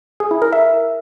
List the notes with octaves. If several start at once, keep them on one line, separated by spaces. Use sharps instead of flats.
G#4
E4
A#4
E5